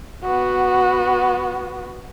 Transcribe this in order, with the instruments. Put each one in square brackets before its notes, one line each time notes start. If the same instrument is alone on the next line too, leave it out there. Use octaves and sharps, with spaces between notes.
[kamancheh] B3 F#4